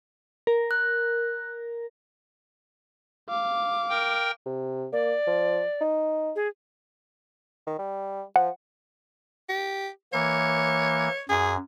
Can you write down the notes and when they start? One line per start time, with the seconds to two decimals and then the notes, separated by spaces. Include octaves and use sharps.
0.47 A#4
0.71 F#6
3.30 F5 D6
3.90 A#4 G5
4.46 C3
4.93 A#3 D5
5.27 F3
5.81 D#4
6.36 G#4
7.67 D#3
7.79 G3
8.36 F3 F#5
9.49 G4
10.13 E3 A#3 C#5
11.29 F#2 G#4